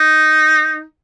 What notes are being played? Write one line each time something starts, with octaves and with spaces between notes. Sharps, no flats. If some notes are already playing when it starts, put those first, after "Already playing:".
Already playing: D#4